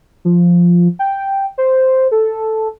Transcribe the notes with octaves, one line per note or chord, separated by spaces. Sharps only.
F3
G5
C5
A4